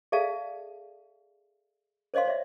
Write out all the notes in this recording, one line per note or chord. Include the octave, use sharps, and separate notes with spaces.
G#4 A4 D5 E5 F5 A5
C5 C#5 D#5 F5 C6
C#5 D5 E5